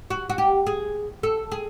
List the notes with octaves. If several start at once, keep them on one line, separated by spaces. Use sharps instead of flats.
F#4
F#4
G4
G#4
A4
G#4